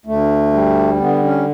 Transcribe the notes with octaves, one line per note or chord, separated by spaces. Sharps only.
D2 A3
G3
D3 B3
C#4